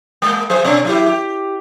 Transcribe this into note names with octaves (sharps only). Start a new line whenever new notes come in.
G#3 A#3
F#3 G#4 C5
B2 C#4 D4
F#3 E4 G4
G4